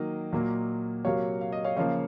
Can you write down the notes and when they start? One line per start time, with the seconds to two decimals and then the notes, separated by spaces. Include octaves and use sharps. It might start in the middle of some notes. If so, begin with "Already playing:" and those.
Already playing: D#3 F#3 A#3 D#5
0.33 A#2 F#3 A#3
1.04 C3 F#3 A#3 C#5 F5
1.41 F5
1.52 D#5
1.64 C#5 F5
1.77 C#3 F3 A#3 C#5 F5